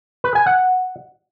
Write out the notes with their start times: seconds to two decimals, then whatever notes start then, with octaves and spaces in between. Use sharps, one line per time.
0.24 B4
0.35 G#5
0.46 F#5